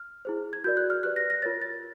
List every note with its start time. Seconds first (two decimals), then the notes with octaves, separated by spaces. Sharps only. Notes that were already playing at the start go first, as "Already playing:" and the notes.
Already playing: F6
0.25 E4 G#4 C5
0.53 G#6
0.64 F#4 A#4 D5 G6
0.77 F#6
0.90 F6
1.03 G4 B4 D5 F#6
1.16 A#6
1.30 A#6
1.42 F4 A#4 C#5 A6
1.62 A6